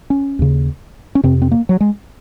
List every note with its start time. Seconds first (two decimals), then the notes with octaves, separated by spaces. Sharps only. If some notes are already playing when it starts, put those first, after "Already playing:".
0.10 C#4
0.39 D#2 C#3
1.15 C#4
1.23 F2 C3 C4
1.42 C4
1.52 A#3
1.69 F#3
1.81 G#3